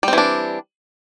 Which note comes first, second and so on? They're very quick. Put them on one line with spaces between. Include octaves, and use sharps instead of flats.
G3 C4 E3 D4